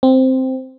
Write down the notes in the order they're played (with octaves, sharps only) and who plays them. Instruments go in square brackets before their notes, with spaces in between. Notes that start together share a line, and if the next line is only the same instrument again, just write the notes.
[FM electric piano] C4